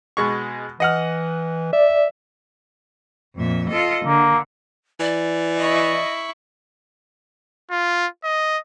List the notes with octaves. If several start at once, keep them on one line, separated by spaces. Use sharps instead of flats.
B2 G#3 C#6
E3 D#5 F#5 F6
D5 E5
F2 A#2 E5
F4 A4 D#5
D3 A#3
E3 D5
E4 D#5 C#6
F4
D#5